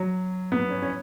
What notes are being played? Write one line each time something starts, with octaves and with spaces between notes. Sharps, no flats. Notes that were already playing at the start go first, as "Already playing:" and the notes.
Already playing: F#3
B3
C#4
C#4